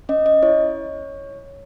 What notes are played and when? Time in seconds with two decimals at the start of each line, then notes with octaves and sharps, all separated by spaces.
0.09 C#4 D#5
0.26 D#5
0.42 E4 C#5